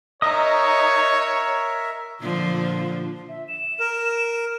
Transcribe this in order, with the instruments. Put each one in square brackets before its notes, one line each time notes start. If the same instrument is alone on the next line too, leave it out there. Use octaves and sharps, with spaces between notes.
[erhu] D#4 [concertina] A#4 E5 [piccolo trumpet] C#5 [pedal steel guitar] D#5 D#6
[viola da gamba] A#2 D3 F3
[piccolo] E5
E7
[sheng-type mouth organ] A#4